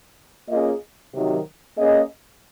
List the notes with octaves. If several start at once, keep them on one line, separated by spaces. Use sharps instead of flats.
A#3 C#4 F4 G#4 D#5
C3 D#3 F#3
A#3 C#4 G#4 D#5